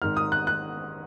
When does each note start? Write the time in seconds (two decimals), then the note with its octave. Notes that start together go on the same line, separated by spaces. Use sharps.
0.02 G#1 G#2 D#3 F6
0.17 D#6
0.32 F#6
0.47 F#6